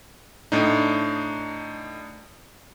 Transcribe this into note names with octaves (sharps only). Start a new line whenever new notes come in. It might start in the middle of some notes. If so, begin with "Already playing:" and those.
A2 D4 D#4